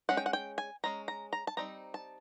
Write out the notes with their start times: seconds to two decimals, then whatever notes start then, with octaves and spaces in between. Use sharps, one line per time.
0.09 G#3 C#4 F#5
0.17 G5
0.26 F#5
0.33 G5
0.58 G#5
0.84 G#3 C#4 A#5
1.08 A#5
1.33 A#5
1.47 A5
1.57 G3 C4 D#4 A#5
1.94 A5